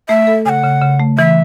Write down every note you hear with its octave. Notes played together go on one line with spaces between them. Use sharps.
A3 E5
A4
C#3 F#5 G#5
C#3
C#3
A3
E3 E5